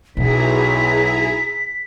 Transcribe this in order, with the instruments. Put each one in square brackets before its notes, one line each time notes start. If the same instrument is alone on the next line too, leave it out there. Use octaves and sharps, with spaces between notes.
[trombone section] B1 [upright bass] B2 [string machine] E4 G#4 A#5 [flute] B6